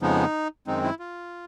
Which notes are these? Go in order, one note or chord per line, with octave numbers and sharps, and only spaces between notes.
F2 C#3 F3 G#3 B3 D#4
F#2 D#3 G#3 C4 D#4
E4
F4